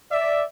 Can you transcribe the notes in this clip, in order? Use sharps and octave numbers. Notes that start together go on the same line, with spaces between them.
D5 E5